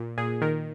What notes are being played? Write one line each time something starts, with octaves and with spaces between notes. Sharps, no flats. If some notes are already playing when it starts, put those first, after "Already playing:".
Already playing: A#2
A#2 G#4
D#3 A#4